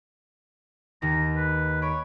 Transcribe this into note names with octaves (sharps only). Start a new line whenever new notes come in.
D#2 D#3 A#5
B4
C#5 B5 D7